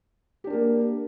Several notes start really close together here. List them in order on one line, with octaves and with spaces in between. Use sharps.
G4 D4 A#4 A#3